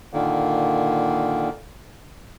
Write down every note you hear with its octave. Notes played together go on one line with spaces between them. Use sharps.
A#2 D3 D#3 A#3